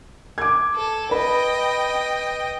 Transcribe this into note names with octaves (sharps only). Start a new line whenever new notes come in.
D6 G#6
A4
B4 D#5 G5 B5